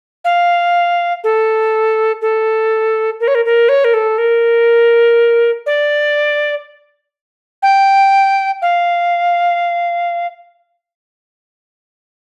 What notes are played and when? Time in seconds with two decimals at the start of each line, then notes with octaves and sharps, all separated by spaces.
0.25 F5
1.24 A4
2.22 A4
3.20 A#4
3.28 C#5
3.35 A#4
3.45 A#4
3.69 C#5
3.84 A#4
3.94 A4
4.18 A#4
5.66 D5
7.63 G5
8.62 F5